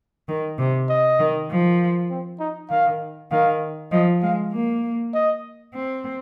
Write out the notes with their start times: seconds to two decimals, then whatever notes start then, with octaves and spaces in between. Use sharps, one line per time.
0.28 D#3
0.58 C3
0.89 D#5
1.19 D#3
1.50 F3
2.10 C4
2.40 D#4
2.70 D#3 F5
3.31 D#3 F5
3.92 F3 D#5
4.22 G#3 F5
4.53 A#3
5.14 D#5
5.74 C4